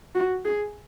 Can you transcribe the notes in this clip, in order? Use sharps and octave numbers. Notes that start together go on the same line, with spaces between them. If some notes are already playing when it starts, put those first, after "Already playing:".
F#4
G#4